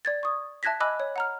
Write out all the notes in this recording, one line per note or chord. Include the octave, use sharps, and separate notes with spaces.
D5 G#6 A6
C#6 D#6
E5 A5 F#6 G#6 A#6 B6
D#5 G#5 B5 D6 E6 F#6
C#5
F#5 A#5 F6